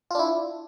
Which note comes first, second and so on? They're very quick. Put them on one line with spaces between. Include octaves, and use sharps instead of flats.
F4 D4 E4